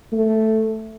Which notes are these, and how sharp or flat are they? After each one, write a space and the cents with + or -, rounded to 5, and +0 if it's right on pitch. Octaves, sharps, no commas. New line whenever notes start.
A3 +0